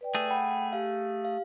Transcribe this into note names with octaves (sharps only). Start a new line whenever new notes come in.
B4 D5 G5
A3 G#4
F#5 G5 B5
G4 F5
F5